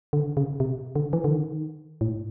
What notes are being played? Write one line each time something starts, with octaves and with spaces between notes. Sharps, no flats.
D3
C#3
C3
D3
E3
D3
D#3
A2